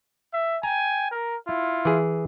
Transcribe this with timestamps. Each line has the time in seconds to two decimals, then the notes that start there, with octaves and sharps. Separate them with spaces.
0.32 E5
0.63 G5 G#5 A#5
1.10 A#4
1.47 E4 F4
1.85 E3 G#4